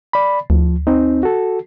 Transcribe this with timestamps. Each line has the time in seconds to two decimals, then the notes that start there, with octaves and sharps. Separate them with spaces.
0.13 D5 B5
0.50 D2 F3
0.87 C4 D#4
1.23 F#4 A4